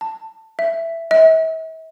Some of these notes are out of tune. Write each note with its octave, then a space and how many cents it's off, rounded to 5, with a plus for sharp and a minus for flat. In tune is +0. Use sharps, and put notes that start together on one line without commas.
A5 +15
E5 +10
E5 -45